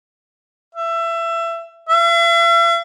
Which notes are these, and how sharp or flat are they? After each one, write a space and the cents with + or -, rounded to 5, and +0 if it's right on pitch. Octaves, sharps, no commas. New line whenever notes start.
E5 +25
E5 +45